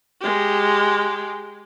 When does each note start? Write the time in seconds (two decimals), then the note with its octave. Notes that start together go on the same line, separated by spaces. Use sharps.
0.21 G#3 G4